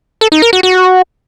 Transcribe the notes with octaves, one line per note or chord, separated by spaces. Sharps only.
A4
D#4
A#4
F#4
F#4